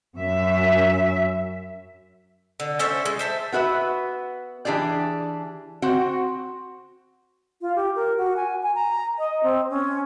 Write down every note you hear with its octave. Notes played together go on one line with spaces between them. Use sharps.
F#2 E5
D3
C#4 A4 C5 E5
G#3
C5 E5 A5
B3 F#4 B4 E5
E3 D4 G4 G#4 D5
C4 F#4 F#5
F4
G4
A#4
F#4
G#5
G#5
A#5
D#5
C4
C#4